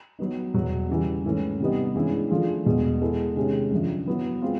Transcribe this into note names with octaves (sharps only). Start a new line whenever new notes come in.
F#3 B3 D#4
E2 B2 F#3
C#3 E3 G3
G#2 E3 A3 C#4
C3 E3 G3 B3 D#4
G2 E3 G#3 C#4 E4
F3 A3 D4 F4 G#4
E2 B2 G#3
G#3 B3 E4 A4
C3 D#3 G#3 C#4
F#2 D3 F3
F#3 B3 E4
G#3 C4 F4